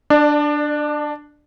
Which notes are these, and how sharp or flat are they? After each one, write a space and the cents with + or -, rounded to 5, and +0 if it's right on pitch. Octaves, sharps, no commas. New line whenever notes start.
D4 +5 D5 +30